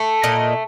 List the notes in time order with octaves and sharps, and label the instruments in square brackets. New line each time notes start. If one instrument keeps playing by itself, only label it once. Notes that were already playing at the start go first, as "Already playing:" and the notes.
Already playing: [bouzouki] A3
A#2 D#5